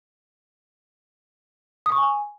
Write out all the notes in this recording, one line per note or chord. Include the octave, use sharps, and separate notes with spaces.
D#6
C#6
G#5